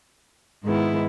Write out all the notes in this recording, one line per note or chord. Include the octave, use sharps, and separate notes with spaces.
G#2 D#3 G#3 B3 E4